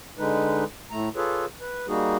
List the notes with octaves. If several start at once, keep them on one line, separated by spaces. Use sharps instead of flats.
D3 G#3 D#4 B4
A2 A3 A#5
F4 G#4 A4 B4 C#5
B4
G3 A#3 D#4 F#4 G#4